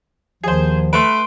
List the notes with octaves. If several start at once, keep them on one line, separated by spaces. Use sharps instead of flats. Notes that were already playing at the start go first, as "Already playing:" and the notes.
D#2 D#3 F3 G#4 C5
A3 B4 C6 D7